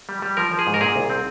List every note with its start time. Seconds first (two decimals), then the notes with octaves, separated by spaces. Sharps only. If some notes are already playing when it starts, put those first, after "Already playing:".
0.09 G3
0.22 G3
0.37 F3 A#4
0.51 F3
0.59 G#4
0.67 G#2
0.74 A#4
0.81 A#2 G#4
0.96 C2
1.10 C4